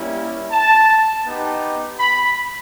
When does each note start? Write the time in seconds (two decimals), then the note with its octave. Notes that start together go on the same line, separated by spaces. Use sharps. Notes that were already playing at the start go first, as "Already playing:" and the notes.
Already playing: G3 A#3 C#4 E4
0.51 A5
1.25 B3 D#4 G4
1.99 B5